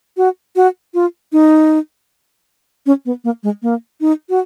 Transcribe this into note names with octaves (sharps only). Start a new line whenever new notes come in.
F#4
F#4
F4
D#4
C#4
B3
A#3
G#3
A#3
D#4
F#4